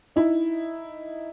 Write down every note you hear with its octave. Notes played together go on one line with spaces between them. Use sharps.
D#4 E4